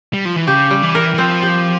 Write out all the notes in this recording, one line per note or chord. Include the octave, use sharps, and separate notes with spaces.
G3
F3
E3
C#3 G4
G3
E3
A#4
E3
F3 C4
G4